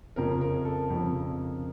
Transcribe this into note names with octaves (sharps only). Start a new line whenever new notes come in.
F2 C#3 F3 A#4
A#4
A4
F2 C#3 F3